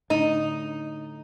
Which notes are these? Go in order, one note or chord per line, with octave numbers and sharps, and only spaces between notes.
A2 D3 D#4